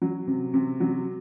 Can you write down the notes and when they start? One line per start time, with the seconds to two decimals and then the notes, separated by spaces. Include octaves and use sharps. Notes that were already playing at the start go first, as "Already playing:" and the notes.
0.02 F#3
0.27 C3
0.54 C3
0.80 F#3